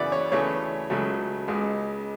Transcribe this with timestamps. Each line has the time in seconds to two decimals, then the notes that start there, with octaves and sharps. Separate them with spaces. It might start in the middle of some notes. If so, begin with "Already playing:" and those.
Already playing: F#2 C#3 E3 B3 D5 E5
0.12 C#5
0.32 D2 C#3 E3 A3 C#5
0.90 C#2 C#3 F#3 A3
1.48 C#2 C#3 G#3